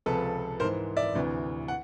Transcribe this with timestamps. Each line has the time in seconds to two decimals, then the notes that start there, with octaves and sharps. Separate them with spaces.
0.06 C#2 C3 F3 A4 B4
0.60 G#2 E3 A#4 C5
0.97 D5 E5
1.14 D2 C3 E3
1.68 F#5